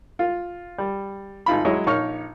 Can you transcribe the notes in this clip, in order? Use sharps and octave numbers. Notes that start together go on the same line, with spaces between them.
F4
G3
G#1 D#4 F4 B5
F#3 G#3 E4 C#5 D#5 E5
A#1 D#4 C#5 C#6 F6